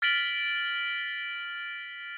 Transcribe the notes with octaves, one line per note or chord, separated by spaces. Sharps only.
F6 A6 B6 D7 F#7 G7